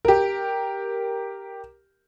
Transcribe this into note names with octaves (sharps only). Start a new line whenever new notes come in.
G4 A#4